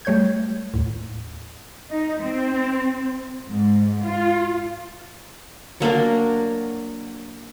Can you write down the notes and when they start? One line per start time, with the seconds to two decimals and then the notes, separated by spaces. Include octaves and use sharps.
0.05 G3 A3 C#5 G6 G#6
0.74 D#2 A2
1.90 D#4
2.21 C4
3.47 G#2
4.02 F4
5.80 F#3 A#3 D4 A#4